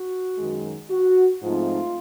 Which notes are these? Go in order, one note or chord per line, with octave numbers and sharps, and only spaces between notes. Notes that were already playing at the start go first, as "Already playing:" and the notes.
Already playing: F#4
F#2 D#3 G#3
F#4
G#2 F3 A3 C4 D#4 F4